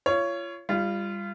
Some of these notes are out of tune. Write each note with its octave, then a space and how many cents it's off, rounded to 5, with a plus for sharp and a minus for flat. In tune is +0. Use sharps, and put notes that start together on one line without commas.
F4 -30 C#5 +10
G3 +20 F4 -20